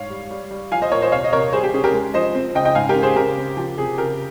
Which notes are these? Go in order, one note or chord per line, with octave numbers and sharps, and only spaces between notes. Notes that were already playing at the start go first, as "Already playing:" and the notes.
Already playing: G#2 C#5 F5
G3
G3
G3
F3 F5 G#5
C5 D#5
A#2 A#4 C#5
C5 D#5
C3 C#5 F5
D#5
C3 A#4 C#5
G3 G#4 C5
G4
C#4 G#4
G4 A#4
G#3
F3 C5 D#5
C4
C#3 D#5 G5
D#5 G5
G#2 F5 G#5
G4 A#4
C#4
G#4 C5
C#3 G4 A#4
C4
F3 G4
C3 G#4
C#3 G4 A#4